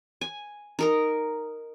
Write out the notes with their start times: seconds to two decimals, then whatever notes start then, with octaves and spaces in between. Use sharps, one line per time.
0.21 G#5
0.79 D#4 A#4 A#5